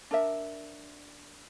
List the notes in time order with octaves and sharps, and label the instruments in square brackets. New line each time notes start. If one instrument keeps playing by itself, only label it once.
[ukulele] D4 A#4 E5